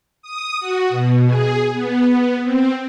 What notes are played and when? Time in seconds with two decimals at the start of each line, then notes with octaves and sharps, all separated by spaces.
0.22 D#6
0.60 F#4
0.89 B2
1.26 G#4
1.73 B3
2.43 C4